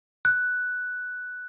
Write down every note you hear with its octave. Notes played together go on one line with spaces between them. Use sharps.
F#6